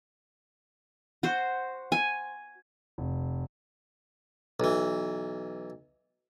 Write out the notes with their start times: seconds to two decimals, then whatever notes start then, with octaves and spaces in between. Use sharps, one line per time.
1.23 F#4 C5
1.92 G#5
2.98 F1
4.60 B1 E3